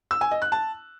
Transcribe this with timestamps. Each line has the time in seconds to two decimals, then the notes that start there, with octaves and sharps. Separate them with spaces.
0.11 E6
0.21 G#5
0.31 D#5
0.42 F#6
0.52 A5